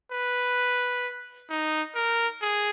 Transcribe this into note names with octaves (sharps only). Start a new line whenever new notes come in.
B4
D#4
A#4
G#4